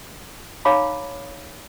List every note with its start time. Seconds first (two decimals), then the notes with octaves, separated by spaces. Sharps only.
0.65 D#4 C#5 F5 A#5 B5 D6